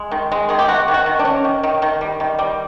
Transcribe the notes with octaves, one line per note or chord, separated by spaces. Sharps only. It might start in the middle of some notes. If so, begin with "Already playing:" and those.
Already playing: G#3
D#3
G#3
D#3 G#4
G4
D#3 F#4
D#3
F#4
D#3
D4
C#4
D#3
D#3
D#3
G3
D#3
G3